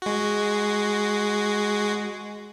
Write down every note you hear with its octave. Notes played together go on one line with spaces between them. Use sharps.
G#3 F#4